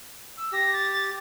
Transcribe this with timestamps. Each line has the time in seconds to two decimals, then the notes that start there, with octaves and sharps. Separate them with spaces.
0.37 E6
0.52 G4 A#6
0.73 A6